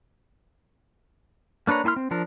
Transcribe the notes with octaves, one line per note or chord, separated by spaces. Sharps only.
A#3 D4 B4 C#5 A#5
A#3 E4 G#5 C6 F6
C4
F3 D4 A#4